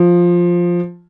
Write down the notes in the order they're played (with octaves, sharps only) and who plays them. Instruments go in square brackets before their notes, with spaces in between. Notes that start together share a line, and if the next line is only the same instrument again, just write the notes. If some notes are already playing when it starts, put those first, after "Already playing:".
Already playing: [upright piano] F3